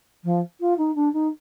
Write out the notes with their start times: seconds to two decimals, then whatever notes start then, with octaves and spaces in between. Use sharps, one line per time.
0.24 F3
0.60 F4
0.78 D#4
0.95 D4
1.13 D#4